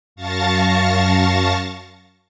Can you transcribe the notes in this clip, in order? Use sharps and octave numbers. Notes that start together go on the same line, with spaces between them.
F#2 F5 A5 C#6 A6 A#6